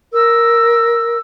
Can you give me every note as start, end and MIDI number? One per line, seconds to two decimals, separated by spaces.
0.14 1.18 70
0.14 1.18 88